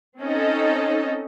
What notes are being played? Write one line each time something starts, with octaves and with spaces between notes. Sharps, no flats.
C4 C#4 D#4 A4 D#5